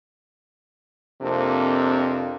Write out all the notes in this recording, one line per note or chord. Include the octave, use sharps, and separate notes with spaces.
F2 C3 A#3 C4 D4